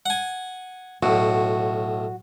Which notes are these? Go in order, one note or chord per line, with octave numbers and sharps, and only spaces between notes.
F#5 G#5
B1 A2 F#4